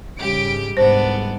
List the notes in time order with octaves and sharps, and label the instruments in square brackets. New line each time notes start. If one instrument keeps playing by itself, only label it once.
[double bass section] G#2 C#3 G3 [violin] G4 D7
[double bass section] C2 G#2 [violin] B3 D4 [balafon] C5